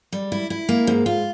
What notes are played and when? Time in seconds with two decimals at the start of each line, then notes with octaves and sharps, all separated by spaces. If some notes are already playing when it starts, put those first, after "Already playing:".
0.13 G3
0.32 E4
0.50 E4
0.69 A#3
0.87 G#2
1.06 F4